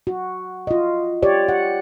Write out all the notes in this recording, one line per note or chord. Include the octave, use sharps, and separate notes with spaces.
F#4
F4 D#5
G4 C#5 D5
F#5